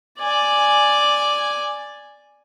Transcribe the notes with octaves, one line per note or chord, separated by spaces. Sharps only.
D5 G#5